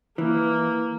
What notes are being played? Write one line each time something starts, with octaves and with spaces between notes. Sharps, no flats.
E3 A#3